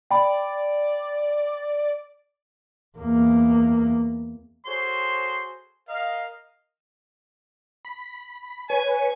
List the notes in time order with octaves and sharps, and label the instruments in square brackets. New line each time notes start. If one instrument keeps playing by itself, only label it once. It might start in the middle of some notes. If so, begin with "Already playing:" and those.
[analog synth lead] D5 [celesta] G5 B5
[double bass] E2 A#3
[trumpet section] F#4 G#4 A4 C5 C#5 C6
A#4 D#5 F5
[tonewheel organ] B5
[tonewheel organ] B4 C#5 [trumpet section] G#5